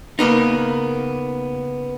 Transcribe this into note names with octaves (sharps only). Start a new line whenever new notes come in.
C#3 A#3 B3 D#4